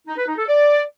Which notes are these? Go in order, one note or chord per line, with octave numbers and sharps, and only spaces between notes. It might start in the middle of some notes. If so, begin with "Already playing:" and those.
D#4
B4
D#4
A4
D5